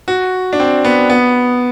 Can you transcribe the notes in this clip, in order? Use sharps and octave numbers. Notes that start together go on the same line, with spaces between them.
F#4
D4
C4
B3
B3